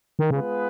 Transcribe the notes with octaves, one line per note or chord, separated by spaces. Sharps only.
D#3
C#3 G#3 B3 F4 G#4 B4